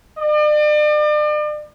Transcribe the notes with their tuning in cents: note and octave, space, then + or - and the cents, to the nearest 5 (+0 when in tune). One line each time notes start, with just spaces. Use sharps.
D5 +40